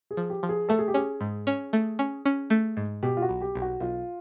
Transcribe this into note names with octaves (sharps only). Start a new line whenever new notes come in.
G#4
F3
G4
F3
G#4
A3 A4
G#4
G4
C#4 G#4
G#2
C#4
A3
C#4
C#4
A3
G#2
B2 G4
F4
F#4
B1
G4
B1
F#4
B1 F4